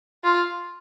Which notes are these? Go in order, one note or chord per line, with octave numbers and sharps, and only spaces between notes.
F4